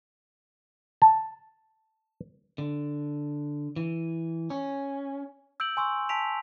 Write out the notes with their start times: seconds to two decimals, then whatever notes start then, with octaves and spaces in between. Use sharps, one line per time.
1.02 A5
2.58 D3
3.76 E3
4.50 C#4
5.60 E6 G6 D7 F#7
5.77 G#5 C6 C#6 E6
6.09 G#5 A5 B6 D7 F7